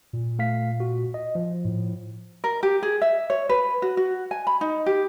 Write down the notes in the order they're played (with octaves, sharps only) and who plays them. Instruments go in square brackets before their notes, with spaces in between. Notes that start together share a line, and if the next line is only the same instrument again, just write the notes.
[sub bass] A#2
[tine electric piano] A3 F5 B6
F#4
D#5
F3
[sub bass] A2
[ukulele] A#4
G4
G#4
E5
C#5
B4
F#4
F#4
G#5
B5
D#4
G4